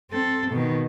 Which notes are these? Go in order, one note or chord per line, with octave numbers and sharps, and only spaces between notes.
C4 A4
B2 D#3